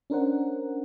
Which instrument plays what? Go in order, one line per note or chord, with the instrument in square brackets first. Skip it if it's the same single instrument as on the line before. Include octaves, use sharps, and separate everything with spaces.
[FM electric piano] C#4 D4 A#4 C5 F#5